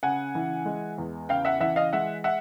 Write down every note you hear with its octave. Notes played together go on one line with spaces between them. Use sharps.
C#3 F#5 G#5
E3
G#3
E2
C#3 F5 G5
E5 F#5
E3 E5 F#5
D#5 F5
G#3 E5 F#5
E5 F#5